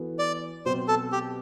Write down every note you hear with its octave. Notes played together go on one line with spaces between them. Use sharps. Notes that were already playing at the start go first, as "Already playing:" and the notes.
Already playing: E3 B3 F#4 A4
D5
B2 F#3 C4 C5
A4
G4